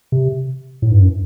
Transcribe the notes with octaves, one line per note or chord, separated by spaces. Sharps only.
C3
A2
G2
F#2